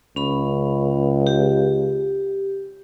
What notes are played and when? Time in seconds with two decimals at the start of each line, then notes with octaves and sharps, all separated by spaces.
0.16 C#2 C#4 B5
1.27 G4